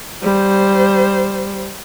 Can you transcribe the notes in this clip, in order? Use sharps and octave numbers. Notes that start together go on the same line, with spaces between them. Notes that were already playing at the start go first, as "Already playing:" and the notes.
G3 C5